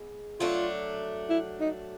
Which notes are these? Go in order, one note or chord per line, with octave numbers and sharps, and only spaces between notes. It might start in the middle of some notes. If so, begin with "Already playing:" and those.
Already playing: G#3 B3
F#3 A3 D4 F4
E4
D#4